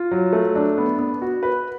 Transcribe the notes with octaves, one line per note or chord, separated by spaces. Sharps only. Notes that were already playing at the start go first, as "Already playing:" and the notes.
Already playing: F4
F#3
A3
D4
B3
B3
F#4
B4